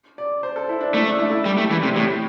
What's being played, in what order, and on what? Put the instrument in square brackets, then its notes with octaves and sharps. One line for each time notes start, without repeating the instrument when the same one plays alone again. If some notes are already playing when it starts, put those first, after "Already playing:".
[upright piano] D5
C5
A4
E4
D4
[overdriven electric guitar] A3 [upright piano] E4
[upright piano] D4
E4
E4
[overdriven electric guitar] G3 [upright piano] G4
[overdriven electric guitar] A3
[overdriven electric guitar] E3 [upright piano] G4
[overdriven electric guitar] C3
[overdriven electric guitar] A2 [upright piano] G4